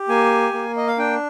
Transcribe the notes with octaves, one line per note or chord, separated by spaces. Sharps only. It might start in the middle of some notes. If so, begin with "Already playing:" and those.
Already playing: G4
A#3 G#5
A#3
D#5
F5
D4 G5